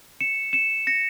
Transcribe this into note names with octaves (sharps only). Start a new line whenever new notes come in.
C#7 E7
C#7 E7
A#6 C#7